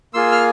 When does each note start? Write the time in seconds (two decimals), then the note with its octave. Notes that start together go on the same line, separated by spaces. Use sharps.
0.14 A#3 F4 G#4 C6 E6
0.32 F6